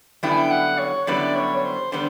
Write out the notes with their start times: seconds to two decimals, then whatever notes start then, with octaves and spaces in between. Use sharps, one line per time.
0.23 F#2 D3 G3 B3 E4 G5
0.31 G#5
0.37 G5
0.51 F#5
0.79 C#5
1.07 F#2 D3 G3 B3 E4 D5
1.35 C#5
1.56 C#5
1.64 C5
1.92 D3 G3 B3 C5